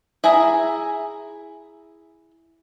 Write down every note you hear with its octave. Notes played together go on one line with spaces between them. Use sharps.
E4 G#4 E5 A#5